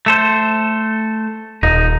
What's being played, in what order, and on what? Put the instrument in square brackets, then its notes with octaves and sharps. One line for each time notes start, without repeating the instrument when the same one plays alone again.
[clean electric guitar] A3 A4 C5
[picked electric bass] D#1 [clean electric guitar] D#4